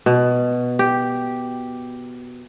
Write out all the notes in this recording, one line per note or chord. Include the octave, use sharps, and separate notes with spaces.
B2
G4